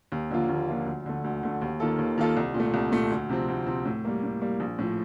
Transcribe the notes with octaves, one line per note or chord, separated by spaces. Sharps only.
D#2
D3 F3 A#3 F4
D#2
D3 F3 A#3 F4
D2
D3 A3
D2
D3 A3
D#2
D#3 A#3 F4 A4
D#2
D#3 A#3 F4 A4
C2
A#2
A3
C2
A#2 A3
D2
C3 F3 C4
D2
C3 F3 C4
A2
G3 A#3
A2
G3 A#3
A#1
A2 F3